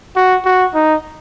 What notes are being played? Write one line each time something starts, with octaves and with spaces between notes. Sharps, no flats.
F#4
F#4
D#4